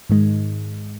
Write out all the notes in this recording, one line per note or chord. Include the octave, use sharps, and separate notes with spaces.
G#2 D#3 G#3